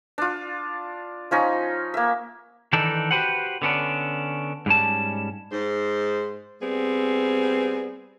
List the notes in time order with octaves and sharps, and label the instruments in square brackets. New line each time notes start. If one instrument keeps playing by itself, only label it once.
[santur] D4 F4
F3 C#4 D#4
A#3 E5
[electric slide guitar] D#3 E3 D4 D#4 A4
F#4 G4 B4 C5 F#5
D3 B3 C#4 D4
G#2 G3 C#4 A5
[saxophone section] G#2 C5
G3 B3 C4 G#4